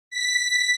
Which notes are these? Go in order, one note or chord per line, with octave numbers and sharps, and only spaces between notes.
B6